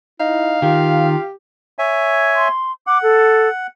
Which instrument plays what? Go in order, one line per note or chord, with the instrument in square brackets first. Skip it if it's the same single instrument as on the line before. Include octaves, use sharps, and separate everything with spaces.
[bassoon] D#4 [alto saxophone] E4 [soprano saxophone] F5
[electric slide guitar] D#3 [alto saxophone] F4 [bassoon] G4
[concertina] C#5 E5 G#5
[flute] C6
[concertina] F#5 [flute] D6
[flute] A4